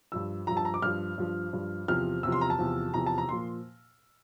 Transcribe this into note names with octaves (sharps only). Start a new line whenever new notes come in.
G2 F3 E6
G2 F3 A#5
A5
A#5
D6
G2 F3 F6
G2 F3
G2 F3
E2 C3 F3 F6
E2 C3 F3 E6
C6
A#5
A5
E2 C3 F3
E2 C3 F3 A#5
A5
A#5
A#2 F3 C6